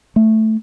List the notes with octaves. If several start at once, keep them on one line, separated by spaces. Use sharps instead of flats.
A3